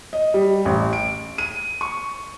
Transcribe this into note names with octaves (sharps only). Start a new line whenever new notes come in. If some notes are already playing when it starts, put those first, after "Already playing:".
D#5
G3
A1
D7
D#7
C#6